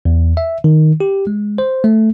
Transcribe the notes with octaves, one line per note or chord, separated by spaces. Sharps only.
E2
E5
D#3
G4
G#3
C5
A3